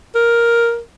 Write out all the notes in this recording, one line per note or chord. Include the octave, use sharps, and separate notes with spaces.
A#4